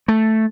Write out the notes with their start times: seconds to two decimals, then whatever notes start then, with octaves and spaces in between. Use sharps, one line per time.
0.08 A3